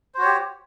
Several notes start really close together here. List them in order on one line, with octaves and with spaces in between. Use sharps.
C5 F#4 C#5 G4